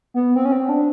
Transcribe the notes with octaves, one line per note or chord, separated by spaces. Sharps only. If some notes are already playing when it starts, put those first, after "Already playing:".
B3
C4
C#4
C4
D4